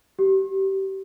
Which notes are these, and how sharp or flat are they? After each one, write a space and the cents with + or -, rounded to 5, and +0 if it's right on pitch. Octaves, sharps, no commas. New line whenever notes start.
G4 -25